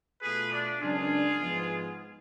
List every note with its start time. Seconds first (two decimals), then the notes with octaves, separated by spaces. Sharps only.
0.21 B2 A3 F4 G#4 A4 B4
0.51 D4
0.80 F#2 C#3 G#3 B3 D4 F4 G#4
1.41 G#2 F3 G#3 B3